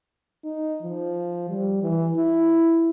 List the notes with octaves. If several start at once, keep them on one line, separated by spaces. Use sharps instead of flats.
D#4
F3
G3
E3
E4